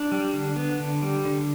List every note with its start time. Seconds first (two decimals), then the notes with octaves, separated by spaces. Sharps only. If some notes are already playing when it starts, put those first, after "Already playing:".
Already playing: D4
0.12 G3
0.33 D3
0.56 B3
0.80 D3
1.03 G3
1.25 D3